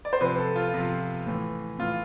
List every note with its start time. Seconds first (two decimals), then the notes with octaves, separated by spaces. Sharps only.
0.05 D5
0.13 C5
0.20 C3 F3 B4
0.38 A4
0.56 F4
0.74 C3 F3
1.26 A2 E3
1.79 A2 E3 F4